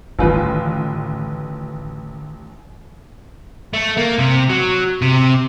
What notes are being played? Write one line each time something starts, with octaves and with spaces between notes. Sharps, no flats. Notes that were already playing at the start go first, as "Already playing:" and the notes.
A1 D3 D#3 F4 B4
A3
A#3
C3
F#3
C3